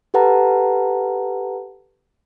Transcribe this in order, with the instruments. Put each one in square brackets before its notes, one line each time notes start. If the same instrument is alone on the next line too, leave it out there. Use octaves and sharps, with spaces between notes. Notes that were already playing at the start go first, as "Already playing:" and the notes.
[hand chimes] G4 A4 B4 F#5 A5 A#5